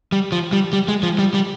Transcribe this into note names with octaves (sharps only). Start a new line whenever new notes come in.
G3
F3
G3
G3
G#3
F3
G3
G3